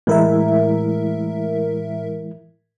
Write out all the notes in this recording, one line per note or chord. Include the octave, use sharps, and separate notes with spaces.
A2 E3 G#3 E4 A#4 E5